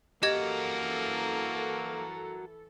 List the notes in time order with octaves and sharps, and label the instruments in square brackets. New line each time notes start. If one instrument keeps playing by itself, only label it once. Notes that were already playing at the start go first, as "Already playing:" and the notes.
[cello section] E3 A4 [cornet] A#3 [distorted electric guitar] F#4 A#4 [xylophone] G4 D#5 G#6